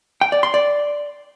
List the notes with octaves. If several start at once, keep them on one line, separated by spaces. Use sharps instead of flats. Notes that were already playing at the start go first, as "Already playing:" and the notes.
G5
D5
C6
D5